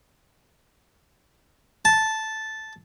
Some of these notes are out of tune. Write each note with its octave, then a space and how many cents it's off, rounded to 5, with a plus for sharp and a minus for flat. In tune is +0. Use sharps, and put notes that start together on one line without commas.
A5 -5